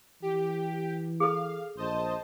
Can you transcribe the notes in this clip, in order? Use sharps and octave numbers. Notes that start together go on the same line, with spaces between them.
E3 G4
G#4 A4 F5
A#1 C5 D#5 A5